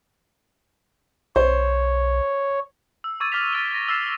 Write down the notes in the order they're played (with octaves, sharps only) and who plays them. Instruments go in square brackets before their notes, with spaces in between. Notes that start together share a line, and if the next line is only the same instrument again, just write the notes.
[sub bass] B1 [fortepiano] C5 [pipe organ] C#5
[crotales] E6
C#6 D6 E6 G#6 A6 D#7
D6 F6 G#6 A6 B6 F7
E6 A6 D7 D#7 G7
A#6
E6 F6 A6 C7 E7